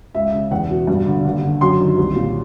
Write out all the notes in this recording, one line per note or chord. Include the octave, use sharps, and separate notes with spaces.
C#2 E5
C#3
E2 F#5
B2
G2
D3
D#2
D3
F#2 C6
D#3
C2
A#2